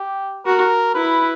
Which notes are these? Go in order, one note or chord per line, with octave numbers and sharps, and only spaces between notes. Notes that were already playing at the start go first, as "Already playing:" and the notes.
Already playing: G4
F#4 A#4
E4 B4